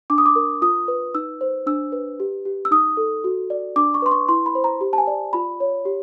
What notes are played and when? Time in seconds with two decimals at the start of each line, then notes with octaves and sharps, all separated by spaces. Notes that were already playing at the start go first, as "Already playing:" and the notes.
0.10 D4 D6
0.18 D#6
0.26 D6
0.36 A#4
0.62 F4 D#6
0.88 B4
1.14 D#4 E6
1.41 C5
1.66 D4 E6
1.92 B4
2.20 G4
2.45 G4
2.65 E6
2.71 D#4 D#6
2.97 A4
3.24 F#4
3.50 D5
3.76 D4 D6
3.94 C#6
4.02 B4 C6
4.11 C#6
4.28 E4 C6
4.46 B5
4.55 C5
4.64 A#5
4.81 G4
4.93 A5
4.98 G#5
5.07 D5
5.33 F4 B5
5.60 C#5
5.85 G4